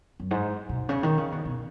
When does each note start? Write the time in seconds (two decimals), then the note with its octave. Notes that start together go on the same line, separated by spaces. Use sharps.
0.20 F#2
0.31 G#2
0.69 B2
0.89 C#3
1.03 D#3
1.18 C#3
1.32 B2
1.45 B2